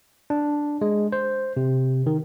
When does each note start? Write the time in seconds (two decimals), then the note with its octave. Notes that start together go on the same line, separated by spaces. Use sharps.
0.30 D4
0.81 G#3
1.12 C5
1.57 C3
2.06 D#3